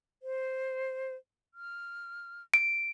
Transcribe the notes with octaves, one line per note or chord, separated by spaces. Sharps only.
C5
F6
D7